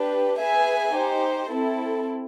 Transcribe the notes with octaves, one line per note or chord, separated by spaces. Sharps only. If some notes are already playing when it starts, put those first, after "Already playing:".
Already playing: D4 G4 B4
G#4 B4 E5 G#5
D#4 G4 C5
C4 E4 A4